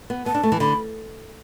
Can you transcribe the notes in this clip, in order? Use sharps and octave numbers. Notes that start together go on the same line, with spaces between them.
B3
B3 A5
D4
A3
E3
D3 B5